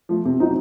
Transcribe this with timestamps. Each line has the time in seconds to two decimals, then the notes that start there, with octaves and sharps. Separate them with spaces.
0.09 F3 A3
0.25 C3
0.40 F#3 C4 D#4